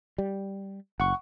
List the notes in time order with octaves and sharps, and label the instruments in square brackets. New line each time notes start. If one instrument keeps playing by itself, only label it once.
[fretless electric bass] G3
[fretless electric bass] F#1 [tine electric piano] F#5 C#6